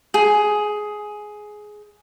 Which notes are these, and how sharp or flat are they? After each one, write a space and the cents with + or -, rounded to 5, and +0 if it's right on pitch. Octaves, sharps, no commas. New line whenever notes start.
G#4 +10